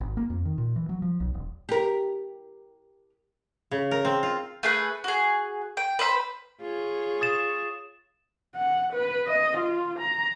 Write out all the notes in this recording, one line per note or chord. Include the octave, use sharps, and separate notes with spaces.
G#1
A#3
F2
D#3
A#2
E3
F#3
F3
B1
D#1
G4 A#4
C#3
A#4
C4
F4
A3 G#4 B4
F#4 G#4
G5
B4 C5 E5 B5
F4 G#4 C#5
D#6 A6 E7
F#5
B4
D#5
F4
A#5